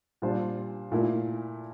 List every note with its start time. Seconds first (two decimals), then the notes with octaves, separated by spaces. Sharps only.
0.22 A#2 G3 D4 F4 C5
0.92 A#2 A3 E4 A#4